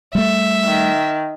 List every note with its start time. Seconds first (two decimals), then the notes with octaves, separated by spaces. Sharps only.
0.15 G3 A3 E5
0.65 D#3